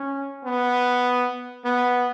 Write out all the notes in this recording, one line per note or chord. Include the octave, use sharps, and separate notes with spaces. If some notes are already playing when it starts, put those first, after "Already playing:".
Already playing: C#4
B3
B3